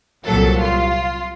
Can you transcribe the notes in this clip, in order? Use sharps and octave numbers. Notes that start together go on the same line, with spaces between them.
C2 A#2 F#3 A4
F4